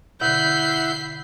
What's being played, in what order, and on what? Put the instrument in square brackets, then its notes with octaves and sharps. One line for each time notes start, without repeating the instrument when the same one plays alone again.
[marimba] B2 D3 [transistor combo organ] E4 F#5 [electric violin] G6 [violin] B6 C7